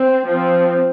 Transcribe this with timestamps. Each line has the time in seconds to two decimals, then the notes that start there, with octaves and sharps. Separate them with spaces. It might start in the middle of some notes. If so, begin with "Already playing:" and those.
Already playing: C4
0.28 F3 C4